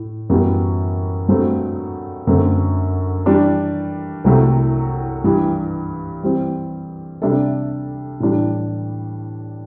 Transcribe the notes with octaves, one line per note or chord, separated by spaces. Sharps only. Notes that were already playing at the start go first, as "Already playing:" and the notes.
Already playing: A2
F#2 E3 G3 B3 F#4
G2 F#3 A3 C4 F#4
F#2 D3 F#3 A3 C4
E3 G3 D4
C2 C3 F#3 A3 E4
G2 E3 G3
E3 G3 C4
C3 G3 D4 A4 E5
A2 E3 G3 D4